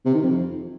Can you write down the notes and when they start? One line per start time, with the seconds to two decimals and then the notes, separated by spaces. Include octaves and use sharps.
0.05 C3
0.14 D#3
0.23 F2